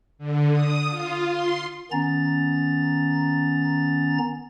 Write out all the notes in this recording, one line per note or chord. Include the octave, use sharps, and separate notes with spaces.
D3
D#6
F4
C6
D#3 B3 C#4 A#5 A6